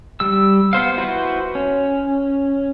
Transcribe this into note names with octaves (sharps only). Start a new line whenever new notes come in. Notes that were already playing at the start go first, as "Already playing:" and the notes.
G3 E6
B3 C5 F5
E4 F#4 B4 C5
C#4